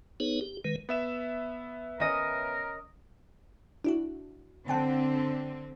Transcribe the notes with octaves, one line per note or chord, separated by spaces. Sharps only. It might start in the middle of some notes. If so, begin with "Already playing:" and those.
B3 D#4 G#4 B4 C#5
G4
D#3 G#3 B4
B3 E5 E7
C#4 A#4 D#5
D4 E4 F#4
D3 C4 F#5 G5 A5